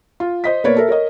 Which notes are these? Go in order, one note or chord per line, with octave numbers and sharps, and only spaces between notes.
F4
C5 D#5 B6
B2 A#3 B4 C#5 D5
A4 A#4 E5
A#4 C#5 D#5